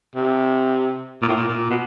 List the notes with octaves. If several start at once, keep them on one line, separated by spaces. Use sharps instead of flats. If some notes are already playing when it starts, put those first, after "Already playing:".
C3
A#2
A2
A#2
A#2
B2